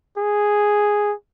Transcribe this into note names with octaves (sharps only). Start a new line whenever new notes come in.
G#4